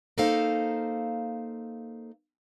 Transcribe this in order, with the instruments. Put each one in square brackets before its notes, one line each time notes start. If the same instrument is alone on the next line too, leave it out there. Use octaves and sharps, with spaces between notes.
[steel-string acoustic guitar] A#3 D#4 A4 C5 F5